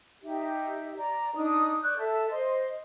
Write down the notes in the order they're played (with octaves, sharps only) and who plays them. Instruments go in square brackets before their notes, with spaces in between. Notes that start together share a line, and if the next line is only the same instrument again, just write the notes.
[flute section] D#4 G4 E5
D5 A#5
D4 D#4 D#6
D5 C#6 F#6 G6
A4 E5 A5
C5 D#5 C6